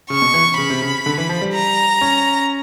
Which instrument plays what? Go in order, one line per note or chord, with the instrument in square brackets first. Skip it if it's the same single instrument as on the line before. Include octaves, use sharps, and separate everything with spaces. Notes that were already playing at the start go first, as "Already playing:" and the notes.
[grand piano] C#3 [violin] C#6
[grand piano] B2
E3
[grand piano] C#3 [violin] B5
[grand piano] C3
C#3
D3
E3
F3
G3
[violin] A#5
[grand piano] C#4